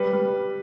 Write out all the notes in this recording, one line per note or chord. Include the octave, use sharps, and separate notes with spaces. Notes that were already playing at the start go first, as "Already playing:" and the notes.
Already playing: G3 B4
G3